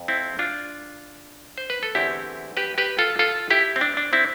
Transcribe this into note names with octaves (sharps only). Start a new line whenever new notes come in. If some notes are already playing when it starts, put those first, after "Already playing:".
Already playing: F2
C4 E4
D4 F4
C5
B4
A4
E2 D3 A3 C4 E4 G4
G4 B4
G4 B4
F4 A4
F4 A4
E4 G4
C4
D4
D4
C4 E4